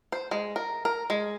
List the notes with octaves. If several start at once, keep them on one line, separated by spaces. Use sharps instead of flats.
C5
G#3
A#4
A#4
G#3